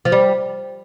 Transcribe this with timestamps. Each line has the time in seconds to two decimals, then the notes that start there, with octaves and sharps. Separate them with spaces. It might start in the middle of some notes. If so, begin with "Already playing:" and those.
0.05 F3
0.12 G3